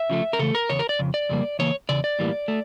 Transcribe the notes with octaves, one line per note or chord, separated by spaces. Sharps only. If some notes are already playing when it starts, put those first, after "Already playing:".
Already playing: E5
C#3 F3 A3
A#4
C#3 E3 A3 A4
A#4
E2 C#3 C#5
A#4
D5
F2 C#3
D5
F2 C#3 G3 A#3
C#3 E3 A#3 C#5
E2 C#3 D5
D5
A2 E3 G3 A#3
A3